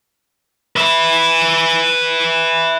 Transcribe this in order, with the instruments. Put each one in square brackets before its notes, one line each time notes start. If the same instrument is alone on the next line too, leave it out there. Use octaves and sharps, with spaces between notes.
[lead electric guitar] B4 E5